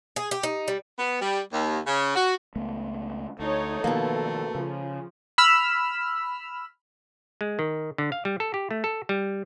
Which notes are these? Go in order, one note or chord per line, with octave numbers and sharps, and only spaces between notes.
G#4
G4
D#4
G3
B3
G3
D#2
C#3
F#4
C#2 A3 B3
D2 A3 D#4 C#5
B2 D#3 F3 A#3 B3 A4
C#3 F3
B5 E6 F6
G#3
D#3
D3
F5
G3
A4
G4
A3
A4
G3